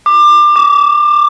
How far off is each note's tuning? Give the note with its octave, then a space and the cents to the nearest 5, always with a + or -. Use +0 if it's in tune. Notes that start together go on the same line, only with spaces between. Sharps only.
D6 +25
D6 -30